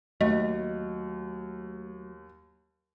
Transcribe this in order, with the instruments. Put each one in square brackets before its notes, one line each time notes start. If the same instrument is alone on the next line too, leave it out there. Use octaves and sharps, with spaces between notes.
[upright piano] D#2 [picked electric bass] F#3 [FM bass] A3 [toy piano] D#5